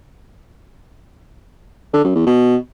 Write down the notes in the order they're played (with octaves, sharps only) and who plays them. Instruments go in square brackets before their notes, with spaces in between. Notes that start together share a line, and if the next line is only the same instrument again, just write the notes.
[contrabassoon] D3
F#2
E2
B2